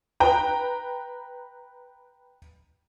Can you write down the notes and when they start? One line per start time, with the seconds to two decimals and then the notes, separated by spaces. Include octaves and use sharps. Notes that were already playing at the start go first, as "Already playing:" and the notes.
0.20 B4 G5 A#5